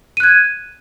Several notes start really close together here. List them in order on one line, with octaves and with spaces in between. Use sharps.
D#7 F#6 G#6